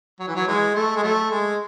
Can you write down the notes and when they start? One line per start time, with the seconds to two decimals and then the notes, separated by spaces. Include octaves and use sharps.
0.20 F#3
0.28 E3
0.36 F#3
0.47 E3 G#3
0.75 A3
0.96 G#3
1.03 F#3 A3
1.30 G#3